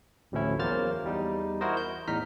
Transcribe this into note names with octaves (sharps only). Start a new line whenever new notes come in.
A1 D2 A2 F3 C#4 E4
E2 F#3 A#3 C5 F6 A6
E2 G3 D#4
E4 F#4 A#4 C5 D#5
G6
E2 A2 D#4 A#5 F6 B6